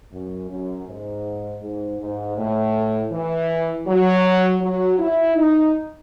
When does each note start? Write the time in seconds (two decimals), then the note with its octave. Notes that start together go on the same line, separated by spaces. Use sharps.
0.12 F#2
0.50 F#2
0.87 G#2
1.62 G#2
2.00 G#2
2.37 A2
3.12 E3
3.87 F#3
4.62 F#3
4.99 E4
5.36 D#4